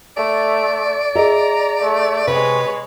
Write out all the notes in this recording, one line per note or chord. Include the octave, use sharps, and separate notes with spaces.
A3 D5
G#4 D#5 E5 A#5
A3
C3 G#3 B4 C#5